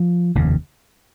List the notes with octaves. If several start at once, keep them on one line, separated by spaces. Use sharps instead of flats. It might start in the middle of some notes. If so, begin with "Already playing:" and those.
Already playing: F3
F1 D#2 C#3